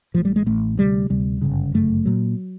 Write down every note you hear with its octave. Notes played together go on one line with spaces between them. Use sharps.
A1 A2 F3
G3
G#3
A1 A2 A3
D2 C3 G3
D2 C3 G3
G1 F#2 C#3
G1 F#2 C#3 A3
A#2 F#3